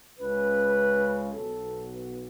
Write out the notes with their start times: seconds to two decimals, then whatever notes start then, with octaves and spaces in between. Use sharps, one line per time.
0.19 C#2 C#3 G#3 B4
1.34 B1 B2 F#3 A4
1.91 B3